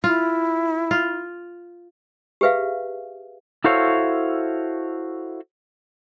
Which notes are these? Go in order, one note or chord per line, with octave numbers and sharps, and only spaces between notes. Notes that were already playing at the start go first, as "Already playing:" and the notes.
E4 F4
F4
G4 G#4 B4 E5 F5
E4 F#4 A4 C5 C#5 F5